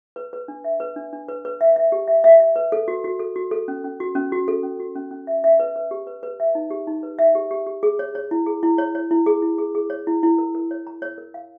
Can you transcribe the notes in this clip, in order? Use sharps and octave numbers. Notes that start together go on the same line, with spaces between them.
B4
B4
D4
E5
B4
D4
D4
B4
B4
E5
E5
G4
E5
E5
E5
B4
A4
F#4
F#4
A4
F#4
A4
C#4
C#4
F#4
C#4
F#4
A4
C#4
F#4
C#4
C#4
E5
E5
B4
B4
G4
B4
B4
E5
D#4
G4
D#4
B4
E5
G4
G4
G4
G#4
C#5
C#5
E4
G#4
E4
C#5
C#5
E4
G#4
E4
G#4
G#4
C#5
E4
E4
A#4
A#4
C#5
A#5
C#5
A#4
F5